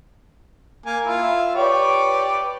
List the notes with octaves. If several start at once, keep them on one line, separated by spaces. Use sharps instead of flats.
A#3 G#5
E4 F4
E5
G4 B4 C#5 D5